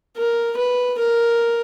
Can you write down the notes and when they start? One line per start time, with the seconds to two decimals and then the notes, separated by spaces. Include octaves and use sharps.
0.17 A#4
0.57 B4
0.98 A#4